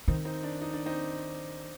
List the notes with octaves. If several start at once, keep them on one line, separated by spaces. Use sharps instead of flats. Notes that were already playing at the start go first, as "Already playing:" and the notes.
D#3 C4 D#4
C4 D#4
D4
D#4
D4
C4 D#4